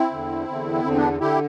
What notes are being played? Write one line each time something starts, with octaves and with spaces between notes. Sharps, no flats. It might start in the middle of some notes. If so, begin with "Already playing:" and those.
Already playing: C4 E4
E2 D3
E2 D3
B3
E2 D3 C4
B3 D4
D3 E4 G4